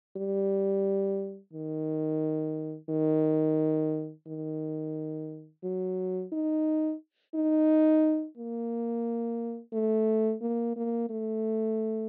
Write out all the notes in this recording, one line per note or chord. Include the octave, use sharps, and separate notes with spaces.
G3
D#3
D#3
D#3
F#3
D#4
D#4
A#3
A3
A#3
A#3
A3